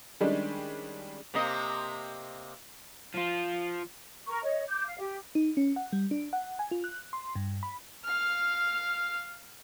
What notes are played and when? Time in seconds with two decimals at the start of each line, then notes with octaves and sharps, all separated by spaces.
0.20 D#3 G3 G#3 C#4 D4
1.34 C3 A#3 D#5
3.14 F3 F4
4.28 A#4 A#5 C#6
4.43 C#5 D#5
4.68 D6 G6
4.84 F5
4.98 G4
5.35 D#4
5.57 C#4
5.76 F#5
5.93 G3
6.11 D4
6.33 F#5
6.59 G#5
6.71 F4
6.84 F#6
7.13 C6
7.35 G2
7.63 B5
8.05 F5 F6